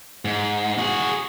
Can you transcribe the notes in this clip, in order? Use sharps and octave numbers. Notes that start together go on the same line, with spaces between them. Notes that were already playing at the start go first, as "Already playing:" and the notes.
G#2
F#4 G#4